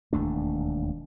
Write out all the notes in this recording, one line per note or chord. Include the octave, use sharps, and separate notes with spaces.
E1 D#2 A3 D4